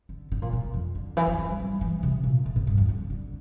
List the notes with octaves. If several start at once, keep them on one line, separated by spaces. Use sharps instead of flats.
D3
D3
A#2
A#2
A#2
F2
D3
E3
E3
F3
G3
G3
E3
C3
A#2
A2
A2
G2
F2
D3
D3